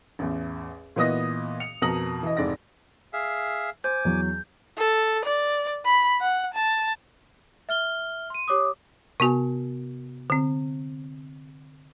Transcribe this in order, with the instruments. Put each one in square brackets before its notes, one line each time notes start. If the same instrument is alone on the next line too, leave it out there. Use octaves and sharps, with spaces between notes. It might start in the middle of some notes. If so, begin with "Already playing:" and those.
[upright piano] A1 E2
A#2 E3 B3 D#5 D#6 A#6
C#7 F7
F2 B2 A#4 D#6 A#6 F#7
E3 D#5
F1 G#2 D5 A#6
[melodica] G#4 E5 F5
[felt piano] C5 [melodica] G#5 D6 [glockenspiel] G6
[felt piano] E2 F#3
[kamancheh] A4
D5
B5
F#5
A5
[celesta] E5 F6 G7
C6 D#7
G4 C#5 D6 D#6
[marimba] C3 B3 F#4 G#5
D3 C4